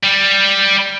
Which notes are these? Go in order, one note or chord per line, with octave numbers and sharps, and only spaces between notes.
G3